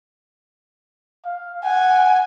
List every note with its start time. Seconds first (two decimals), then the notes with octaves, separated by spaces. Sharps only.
1.26 F5
1.64 F#5 G#5